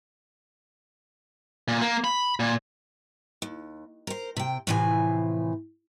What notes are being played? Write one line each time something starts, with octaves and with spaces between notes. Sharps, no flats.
A#2
A#3
B5
A#2
D#2
A#4 C5
C3 G5
A2 C3 E3 F3 D5 G#5